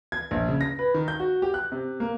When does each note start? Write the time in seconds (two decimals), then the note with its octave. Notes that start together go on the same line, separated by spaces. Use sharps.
0.12 G#6
0.31 A#1
0.48 C#3
0.61 A#6
0.79 B4
0.94 D#3
1.08 G6
1.20 F#4
1.42 G4
1.54 F#6
1.72 C3
2.00 A#3